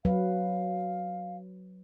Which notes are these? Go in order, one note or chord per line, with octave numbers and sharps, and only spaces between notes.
F#3 B4 F5